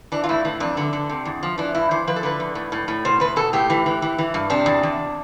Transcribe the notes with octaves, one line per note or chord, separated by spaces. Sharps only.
E3 D4
F4
A2 E4
E3
F2 D4
D3
D3
C3
E2
F3
E3 D4
G2 E4
E3 C5
F3 B4
A4
D3 B4
E2
A2
A2
A2
B2 C5
E2 B4
B2 A4
A2 G4
E3
E3
E3
E3
G2
C3 D4
E2
E2